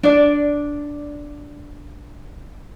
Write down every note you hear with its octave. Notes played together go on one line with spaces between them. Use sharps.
D4 D5